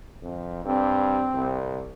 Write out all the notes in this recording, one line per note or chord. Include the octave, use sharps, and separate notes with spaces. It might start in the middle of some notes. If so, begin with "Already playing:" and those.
F2
G2 C4
C2